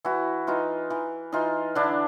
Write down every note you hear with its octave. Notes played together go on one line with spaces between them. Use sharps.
E3 E4 F#4
E3 D#4 F4
E3
E3 D#4 F4
D3 D4 E4